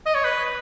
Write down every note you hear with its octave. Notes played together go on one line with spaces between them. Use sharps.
D#5
C#5
B4